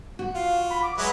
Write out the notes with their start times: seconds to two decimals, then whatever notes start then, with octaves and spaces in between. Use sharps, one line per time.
0.19 F#4
0.35 F4 F5
0.70 B5
0.83 D6
0.98 F#3 G#3 B4 E5